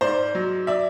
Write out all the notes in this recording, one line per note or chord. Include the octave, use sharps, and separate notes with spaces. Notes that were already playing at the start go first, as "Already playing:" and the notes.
G#2 C5 D5
F#3
D5 E5